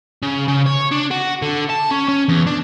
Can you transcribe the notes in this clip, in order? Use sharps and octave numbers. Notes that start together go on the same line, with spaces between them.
C#3
C#3
C#5
D4
F#4
D3
A5
C#4
C#4
E2
D4